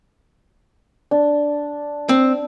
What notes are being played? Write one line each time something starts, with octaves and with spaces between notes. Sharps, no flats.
D4
C4